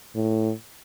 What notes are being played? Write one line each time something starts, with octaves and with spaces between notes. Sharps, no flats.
A2